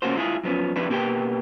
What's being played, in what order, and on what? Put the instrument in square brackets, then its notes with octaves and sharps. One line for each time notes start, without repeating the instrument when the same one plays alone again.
[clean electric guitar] C#3 A#3 C#4 F4 F#4 C5
G#3 E4 F4 G#4
F#2 F3 B3 C#4
F3 G3 C4 D4 E4 B4
B2 A#3 G4 A#4 B4 G5